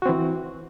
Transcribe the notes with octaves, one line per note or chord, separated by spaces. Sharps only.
E3 C4 F#4